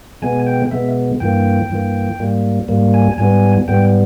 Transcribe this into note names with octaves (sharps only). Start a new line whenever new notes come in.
B2 G#3 B3 G#5
G5
B2 G#3 B3 E5
G2 E3 A#3 G5
G2 E3 A#3
G#2 G3 A#3
G#2 G3 A#3
G#5
G#2 G3 B3 G#5
G#2 G3 B3 G5